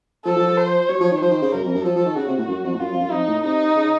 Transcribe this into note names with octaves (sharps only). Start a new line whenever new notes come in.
F3 A4
F3
F3
C5
F#3 C#5
F3
D#3
F3 C5
D#3
C#3
F#2 A#4
F2
F#2
F3 A4
F3
D#3
C#3 F#4
C3
A2
F#2
F2
A2
F#2 F4
F2
F#2
F2 D#4
A2
C3 D#4
C#3